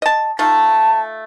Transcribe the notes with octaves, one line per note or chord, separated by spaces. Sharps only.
D#5 A5
A3 D#4 F4 A5